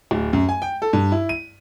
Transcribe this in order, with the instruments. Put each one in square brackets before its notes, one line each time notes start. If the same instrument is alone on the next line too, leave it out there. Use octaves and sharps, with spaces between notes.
[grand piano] D1
F#2
G#5
G5
A4
G2
E4
D#7